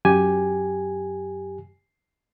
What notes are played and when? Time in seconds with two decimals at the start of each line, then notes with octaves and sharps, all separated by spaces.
0.05 F#2 G4 G#5